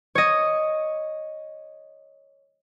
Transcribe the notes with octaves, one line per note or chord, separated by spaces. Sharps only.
C#5 D#5